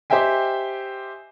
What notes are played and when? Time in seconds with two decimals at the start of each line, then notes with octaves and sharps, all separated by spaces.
0.10 G4 C5 D#5 E5 G5 G#5